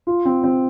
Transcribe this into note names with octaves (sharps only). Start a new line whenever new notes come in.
F4
C4
C4